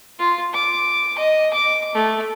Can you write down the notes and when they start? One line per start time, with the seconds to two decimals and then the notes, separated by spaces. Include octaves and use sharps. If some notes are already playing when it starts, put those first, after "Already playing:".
0.19 F4
0.54 D6
1.19 D#5
1.54 D6
1.95 A3